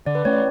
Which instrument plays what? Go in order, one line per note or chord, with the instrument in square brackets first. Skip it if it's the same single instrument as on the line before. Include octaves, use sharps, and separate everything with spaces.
[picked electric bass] D3 [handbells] D5
[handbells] B4
[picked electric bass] A3 C#4 [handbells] C#5
[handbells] D5